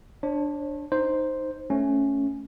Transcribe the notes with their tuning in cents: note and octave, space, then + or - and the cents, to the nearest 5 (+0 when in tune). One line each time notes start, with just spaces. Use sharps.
D4 +0 C#5 -40
D#4 +0 C5 +0
A3 +0 C#4 +0